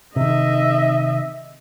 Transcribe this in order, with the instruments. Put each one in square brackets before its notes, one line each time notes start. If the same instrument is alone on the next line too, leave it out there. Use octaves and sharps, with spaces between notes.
[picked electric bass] C3 D#3 [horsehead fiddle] D#5 E5